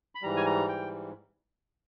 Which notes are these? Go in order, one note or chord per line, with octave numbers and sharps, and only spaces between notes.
B5
G#2 E3 G3 A#5
G#5
A#5
G5